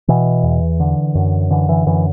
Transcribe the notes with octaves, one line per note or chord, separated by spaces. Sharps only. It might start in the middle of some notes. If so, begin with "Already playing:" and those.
B2 E3
E2
D3
F#2
D3 E3
E3
F#2 E3